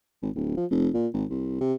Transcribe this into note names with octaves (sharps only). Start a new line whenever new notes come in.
G#1
D1
F3
F1
A#2
G#1
C2
C3